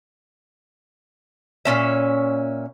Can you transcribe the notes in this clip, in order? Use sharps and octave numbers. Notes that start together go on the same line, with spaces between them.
A#2 C#4 E5